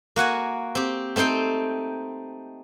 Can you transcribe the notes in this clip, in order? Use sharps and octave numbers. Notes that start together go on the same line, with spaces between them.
A#3 F#4 F#5 G#5
C4 G4
A3 C4 D#4 C5 G5